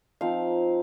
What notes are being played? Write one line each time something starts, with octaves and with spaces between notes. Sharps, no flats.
F3 C4 D#4 F5